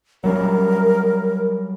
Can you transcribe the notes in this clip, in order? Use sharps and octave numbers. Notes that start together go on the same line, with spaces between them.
F#3 G3 C#4 A#4